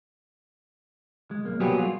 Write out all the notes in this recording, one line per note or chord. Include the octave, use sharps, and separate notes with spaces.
G#3
B1 A#3
F#3 G3 A#3 B3 G4 G#4
F4